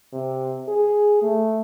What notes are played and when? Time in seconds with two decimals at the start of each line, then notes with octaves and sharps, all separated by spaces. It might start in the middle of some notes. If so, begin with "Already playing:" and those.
0.13 C3
0.68 G#4
1.22 A3